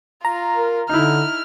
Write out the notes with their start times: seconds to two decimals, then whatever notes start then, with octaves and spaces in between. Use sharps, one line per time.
0.25 F4 A#5
0.55 A#4
0.89 D3 D#4 E4 F6